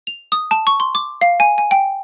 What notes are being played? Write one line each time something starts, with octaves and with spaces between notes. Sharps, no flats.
F7
D#6
A5
C#6
C6
D6
F5
G#5
G#5
G5